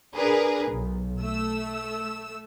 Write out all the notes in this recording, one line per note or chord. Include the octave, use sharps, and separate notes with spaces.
D4 G#4 A#4 B4
B1
A3 E6